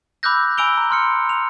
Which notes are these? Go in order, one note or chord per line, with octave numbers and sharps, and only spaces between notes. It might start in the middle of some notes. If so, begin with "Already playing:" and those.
B5 D6 E6 F#6 G6 A#6
G#5 B5 E6 D7 F7 G7
A#5
C6 F6 C#7
F7